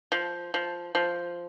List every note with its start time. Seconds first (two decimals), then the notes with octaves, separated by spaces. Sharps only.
0.12 F3
0.54 F3
0.95 F3